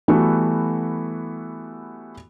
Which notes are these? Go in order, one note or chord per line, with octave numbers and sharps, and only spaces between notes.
E3 G3 A3 B3 F#4